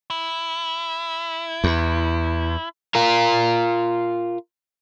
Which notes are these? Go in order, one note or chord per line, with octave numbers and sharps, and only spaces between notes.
E4
E2
F4 A#4